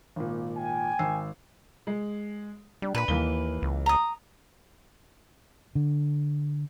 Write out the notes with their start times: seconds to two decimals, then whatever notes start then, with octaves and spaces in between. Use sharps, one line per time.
0.16 G#1 A#2
0.57 G5 G#5
0.99 G#1 E6 C7
1.87 G#3
2.82 G3 D4
2.95 A#2 B4 B5
3.08 D#2 E3 A#3 G7
3.62 C#2
3.86 A#5 D#6
5.75 D3